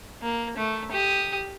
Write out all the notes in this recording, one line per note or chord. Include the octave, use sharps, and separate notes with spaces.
A#3
A3
G4 D#6